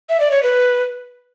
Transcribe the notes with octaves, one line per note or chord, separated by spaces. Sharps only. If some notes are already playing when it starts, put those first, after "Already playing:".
E5
D5
C#5
B4